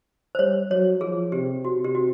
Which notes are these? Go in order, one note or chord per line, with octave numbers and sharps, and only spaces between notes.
C5
G3 C#5
F#3 C#5
F3 G#4
C3 G4
F#4
C3
G4
F#4